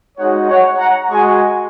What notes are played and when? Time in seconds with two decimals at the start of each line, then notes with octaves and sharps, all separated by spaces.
0.18 G#3 D#4 F#4 C#5 F#5
0.48 C#5 F#5
0.78 F#5 A#5
1.09 G#3 F#4 G#5 C#6